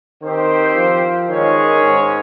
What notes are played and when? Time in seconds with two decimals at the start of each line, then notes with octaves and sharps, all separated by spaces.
0.22 D#3 C4 G4 C5
0.76 F3
1.29 D#3 G#3 C#4 G#4 C#5
1.83 G#2